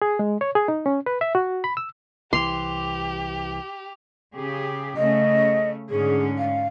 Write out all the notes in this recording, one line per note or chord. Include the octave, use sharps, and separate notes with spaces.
G#4
G#3
C#5
G#4
D#4
C#4
B4
E5
F#4
B5
E6
C2 E3 G4 C6 D6 F7
C#3 G4 G#4
C#3 A3 C#4 D#5
G#2 D3 C#4 G#4
F5